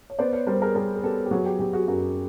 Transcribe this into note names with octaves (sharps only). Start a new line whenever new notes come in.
C#5
B3 C5 D5
B4 C#5
G3 A#4 C5
G#4 A#4
G3 G#4 A#4
G#4
B3 G4 A4
G4
F#3 F#4 G#4
G4
F#3 G4
F#4 G#4
F#2 F#4